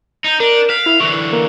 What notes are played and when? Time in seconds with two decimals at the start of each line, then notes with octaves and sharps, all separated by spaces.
0.24 D#4 G6
0.40 D4 A#4
0.70 F5 B6
0.86 E4
1.00 D3 E3 C#6
1.33 A#3